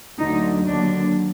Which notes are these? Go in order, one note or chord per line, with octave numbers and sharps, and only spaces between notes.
D2 D3 F#3 D#4
D#2 D3 F#3 D4